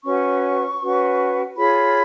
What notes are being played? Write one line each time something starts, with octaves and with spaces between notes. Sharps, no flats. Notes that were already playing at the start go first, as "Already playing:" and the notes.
C#4 F#4 B4 C#6
C#4 F#4 B4
F4 G#4 C#5 B5